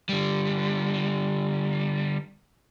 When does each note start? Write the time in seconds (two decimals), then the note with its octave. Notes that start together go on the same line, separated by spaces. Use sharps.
0.09 D3 G3